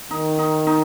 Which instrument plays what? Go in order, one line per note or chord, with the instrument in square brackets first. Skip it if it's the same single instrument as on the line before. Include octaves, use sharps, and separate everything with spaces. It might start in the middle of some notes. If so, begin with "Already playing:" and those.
[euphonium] D#3 [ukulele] D#4
[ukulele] D#4
D#4